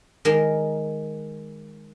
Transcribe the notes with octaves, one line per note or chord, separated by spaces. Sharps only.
D#3 G#3 D#4 A#4